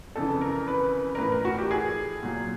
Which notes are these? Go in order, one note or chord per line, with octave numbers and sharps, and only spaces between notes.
F2 C#3 E3 A4
A#4
B4
A#4
A2 E3 B4
A#4
F#4
G4
G#4
A#2 F#3